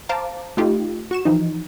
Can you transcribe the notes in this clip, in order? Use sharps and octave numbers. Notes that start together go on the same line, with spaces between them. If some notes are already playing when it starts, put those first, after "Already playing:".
C5 F5 A5 A#5 D6
A3 D#4 F4 G4
F#4 C#6 E7
E3 F3 D#4